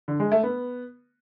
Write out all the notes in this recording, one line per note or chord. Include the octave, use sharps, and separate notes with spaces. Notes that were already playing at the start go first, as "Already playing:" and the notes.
D3
G#3
A3
B3